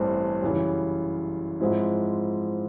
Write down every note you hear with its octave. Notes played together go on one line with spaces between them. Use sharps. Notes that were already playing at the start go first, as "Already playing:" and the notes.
Already playing: A1 G2 E3 A3 C4
F#2 C#3 E3 G3
G#2 F3 G#3 C4 E4